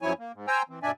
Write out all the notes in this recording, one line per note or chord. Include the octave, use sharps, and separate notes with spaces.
F#2 F3 F#3 E4 C#5 G#5
A#3
G#2
C5 G5 G#5 A#5 E6
E3 C4
G2 B2 D4 D5 E5 G#5